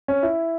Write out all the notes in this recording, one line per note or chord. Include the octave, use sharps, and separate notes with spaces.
C#4
E4